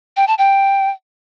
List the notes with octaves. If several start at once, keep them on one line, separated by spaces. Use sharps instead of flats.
G5
A5
G5